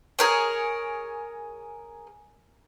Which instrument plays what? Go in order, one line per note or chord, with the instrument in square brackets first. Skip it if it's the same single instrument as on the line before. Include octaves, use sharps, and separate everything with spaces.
[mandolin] G#4 A#4 C#5